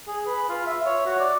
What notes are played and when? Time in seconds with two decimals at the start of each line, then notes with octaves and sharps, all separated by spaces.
0.08 G#4
0.27 B4
0.49 F4
0.67 E5
0.86 C#5
1.06 F#4
1.20 D5